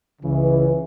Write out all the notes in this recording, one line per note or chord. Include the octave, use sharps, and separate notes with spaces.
C#2 C#3 E3